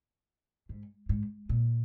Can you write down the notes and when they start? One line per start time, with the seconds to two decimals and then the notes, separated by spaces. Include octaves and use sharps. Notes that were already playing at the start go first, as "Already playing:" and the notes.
0.69 G#2
1.09 G#2
1.49 A#2